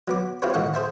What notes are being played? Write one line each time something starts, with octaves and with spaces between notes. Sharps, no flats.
F#3 B3 D6
C4 E4 F4 G4 B4 C#5
A2 D#3 G#3 A4 F#5 C#6
G#4 C5 E5 A5